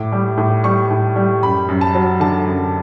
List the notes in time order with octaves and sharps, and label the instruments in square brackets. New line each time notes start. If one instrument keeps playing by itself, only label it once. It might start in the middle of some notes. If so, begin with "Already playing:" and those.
Already playing: [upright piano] A2 D6
G3
A2
G3 C#6
A2
G3
F#2 B5
F#2
A5
F#3
D3 A5
F#2